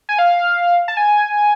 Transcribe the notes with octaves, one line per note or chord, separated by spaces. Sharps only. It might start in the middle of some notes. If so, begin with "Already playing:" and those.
G#5
F5
A5
G#5